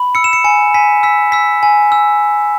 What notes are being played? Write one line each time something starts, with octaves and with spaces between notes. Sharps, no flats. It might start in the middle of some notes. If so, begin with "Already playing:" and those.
Already playing: B5
E6 C#7
E7
C#7
G#5 C#7
G#5 B6
E6 B6
E6 B6
G#5
E6